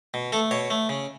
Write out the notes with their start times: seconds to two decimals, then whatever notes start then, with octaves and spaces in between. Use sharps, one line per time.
0.14 B2
0.32 A3 A4
0.51 B2 C#5
0.70 A3
0.89 C#3